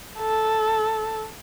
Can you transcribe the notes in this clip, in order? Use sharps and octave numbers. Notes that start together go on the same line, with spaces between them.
A4